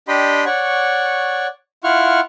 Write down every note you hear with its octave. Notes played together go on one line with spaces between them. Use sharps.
D4 G4 D#5 G5 B5 C6
C#5 D5 F#5 C#6
E4 F4 F#5 C#6 F6